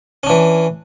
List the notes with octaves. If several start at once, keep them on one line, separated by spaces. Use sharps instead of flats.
E3 C#4 D4